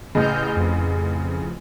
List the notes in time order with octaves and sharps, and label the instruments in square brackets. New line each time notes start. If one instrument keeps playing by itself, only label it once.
[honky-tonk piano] A1 C#3 [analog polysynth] D#5 F6 G6
[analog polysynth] F2